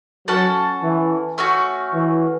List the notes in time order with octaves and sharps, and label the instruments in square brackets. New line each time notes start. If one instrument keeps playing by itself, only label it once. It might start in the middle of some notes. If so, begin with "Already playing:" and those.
[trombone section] F#3 [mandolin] C#4 A4 F#5 A5
[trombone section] E3
[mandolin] A3 C#4 F#4
[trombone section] E3